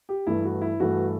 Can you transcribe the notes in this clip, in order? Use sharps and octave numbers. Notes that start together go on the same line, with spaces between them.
G4
G2 E3 A3 E4
F#4
E4
G2 E3 A3 F#4